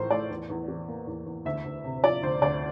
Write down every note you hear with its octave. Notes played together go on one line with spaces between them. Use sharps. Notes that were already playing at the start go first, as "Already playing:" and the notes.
Already playing: A1 A2 F3 A#4 C5
A3 D5
E2
E2
E3
A#3
E2
E2
D2 E5
D2
C3
F3 D5
D2 C5
D2 D5